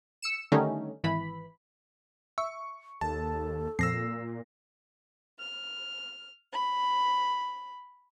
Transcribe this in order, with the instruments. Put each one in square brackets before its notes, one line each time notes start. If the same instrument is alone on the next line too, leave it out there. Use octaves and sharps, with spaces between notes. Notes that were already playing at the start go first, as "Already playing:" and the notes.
[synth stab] E6 C#7 E7
D3 D#3 G3 A3 C#4 D#4
G#1 E3 B5
[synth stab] E5 [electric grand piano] C#6
[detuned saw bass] D#2 [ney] A4 [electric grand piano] A5
[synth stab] F2 [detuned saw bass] A#2 [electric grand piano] E6 A#6 C7
[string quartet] F6
B5